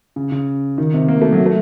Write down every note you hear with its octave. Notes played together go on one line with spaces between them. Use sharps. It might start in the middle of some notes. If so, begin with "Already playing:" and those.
C#3
C#3
D#3
C3
A#3
A3
F#3
A3